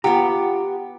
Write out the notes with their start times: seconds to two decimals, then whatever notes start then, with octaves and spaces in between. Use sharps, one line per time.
0.04 B3 F4 G4 F#5 A#5